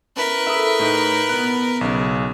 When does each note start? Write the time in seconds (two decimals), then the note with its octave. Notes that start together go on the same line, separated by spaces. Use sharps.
0.16 C#4 E4 A#4 B4
0.47 E4 G#4 A4 E5 D#6
0.80 A2 D#4
1.29 B2 B3 F#6
1.81 B1 C#3